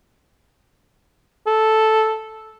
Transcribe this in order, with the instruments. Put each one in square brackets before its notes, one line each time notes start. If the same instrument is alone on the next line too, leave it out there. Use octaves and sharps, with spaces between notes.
[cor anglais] A4